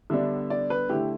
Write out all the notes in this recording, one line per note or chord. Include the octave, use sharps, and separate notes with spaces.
D3 G3 B3 D4 E5
D5
B4
D3 A3 E4 G4